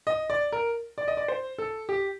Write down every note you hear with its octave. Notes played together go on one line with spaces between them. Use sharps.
D#5
D5
A#4
D5
D#5
D5
C5
A4
G4